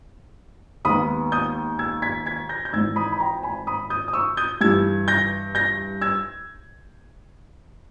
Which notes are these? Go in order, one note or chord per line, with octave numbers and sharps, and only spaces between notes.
D#2 D#3 G#3 B3 B5 D#6
D#6 G6
E6 G#6
G#6 B6
G#6 B6
G6 A#6
G6
G#1 G#2 E3 E6 G#6
B5 D#6
B5
G5 A#5
G#5 B5
B5 D#6
D#6 G6
D#6
C#6 E6
D#6 G6
G2 E3 G3 E6 G#6
G6 A#6
G6 A#6
E6 G#6